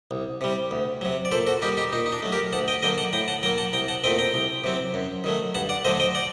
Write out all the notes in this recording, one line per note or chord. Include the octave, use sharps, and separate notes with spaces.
C2
C3 G3
D2
C3 F#3
D5
A#2 A4 C5
F#4 A4
G3 A#3 D#4 G4
D#4 G4
A#2 D#4
D#4
D4
F#3 A3
G4 A#4
D2 F#5 A5
D#5 G5
D3 F#3 A#3 D#5 G5
F#5 A5
A2 G5 A#5
F#5 A5
F#3 A#3 G5 A#5
F#5 A5
C2 G5 A#5
F#5 A5
A#2 A3 C4 D#5 G5
G5 A#5
C2
C3 F#3 C4
F#2
D#3 F#3 A3
G2 F#5 A5
D5 F#5
D3 F#3 A3 C5 D#5
D#5 G5
D5 F#5